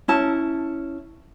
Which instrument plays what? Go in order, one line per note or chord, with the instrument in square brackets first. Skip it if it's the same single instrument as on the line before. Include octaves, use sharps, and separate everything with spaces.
[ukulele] C#4 E4 A5